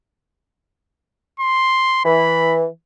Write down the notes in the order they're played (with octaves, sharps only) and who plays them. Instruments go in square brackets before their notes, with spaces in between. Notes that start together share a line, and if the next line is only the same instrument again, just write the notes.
[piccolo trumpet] C6
[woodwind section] E3 [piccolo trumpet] B5